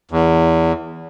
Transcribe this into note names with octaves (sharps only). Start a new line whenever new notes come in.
E2